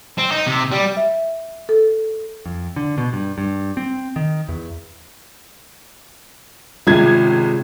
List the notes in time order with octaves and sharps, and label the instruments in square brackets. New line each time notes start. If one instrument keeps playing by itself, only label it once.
[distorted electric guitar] C4
D#4
C3
G3
[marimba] E5
A4
[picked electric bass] F2
D3
B2
G2
G2
C4
D#3
E2
[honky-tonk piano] G#1 C#2 G#6 [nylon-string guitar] C3 F4